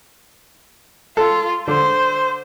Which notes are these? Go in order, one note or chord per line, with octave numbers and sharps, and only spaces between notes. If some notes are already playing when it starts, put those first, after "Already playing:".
F4 A4
D3 C5